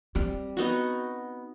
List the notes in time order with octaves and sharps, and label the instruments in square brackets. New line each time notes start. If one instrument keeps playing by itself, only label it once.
[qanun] G3 [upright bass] C4
[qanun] B3 D#4 F#4